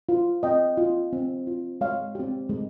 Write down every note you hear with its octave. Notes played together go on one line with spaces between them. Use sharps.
F4
C4 D#5 G5
F4
C4
F4
G#3 C#5 F5
C4 G4
G#3